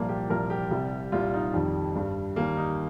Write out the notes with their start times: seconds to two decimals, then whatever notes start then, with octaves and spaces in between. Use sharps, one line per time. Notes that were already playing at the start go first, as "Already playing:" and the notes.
Already playing: C2 A#2 F3 A#3
0.09 G4
0.29 C2 A#2 F3 A#4
0.50 G4
0.71 C2 C3 G3
1.12 C2 A#2 G3 F4
1.34 D#4
1.54 F2 D#3 G3
1.96 G2 G3
2.36 D#2 D#3 G3 A#3
2.57 D#4